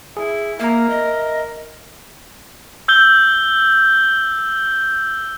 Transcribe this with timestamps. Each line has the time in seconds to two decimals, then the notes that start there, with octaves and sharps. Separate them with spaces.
0.17 E4 G#4
0.60 A#3 A#4 E5 A#5
0.90 D#5
2.88 E6 G6 G7